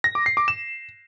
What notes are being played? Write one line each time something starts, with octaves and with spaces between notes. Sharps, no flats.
A#6
D6
C7
D6
E7